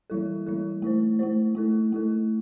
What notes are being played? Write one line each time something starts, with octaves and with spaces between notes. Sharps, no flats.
E3 G3 E4 A4
E3 G3 E4 A4
A3 E4 C5
A3 E4 C5
A3 E4 A4
A3 E4 A4